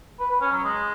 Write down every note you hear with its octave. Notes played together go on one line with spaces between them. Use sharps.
B4
B4
C#4
F#3
G#3